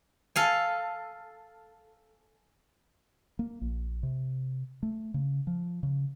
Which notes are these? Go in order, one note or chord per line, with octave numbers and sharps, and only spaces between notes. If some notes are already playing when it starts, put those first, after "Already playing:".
A4 F5 G#5
A#3
A#1
C3
A3
C#3
F3
C#3